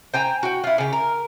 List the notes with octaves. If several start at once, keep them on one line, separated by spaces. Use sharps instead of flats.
C5 G5 G#5 A#5
F#4 G5
E4 F4
C#3 G4
A#4